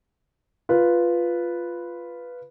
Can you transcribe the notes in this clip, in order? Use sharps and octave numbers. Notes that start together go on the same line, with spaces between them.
F4 B4